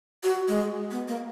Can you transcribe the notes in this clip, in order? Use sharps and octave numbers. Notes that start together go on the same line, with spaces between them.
F#4
G#3
B3
A#3